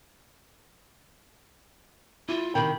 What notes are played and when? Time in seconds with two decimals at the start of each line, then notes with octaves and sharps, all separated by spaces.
2.29 E4 F4
2.55 C3 D#3 G5 B5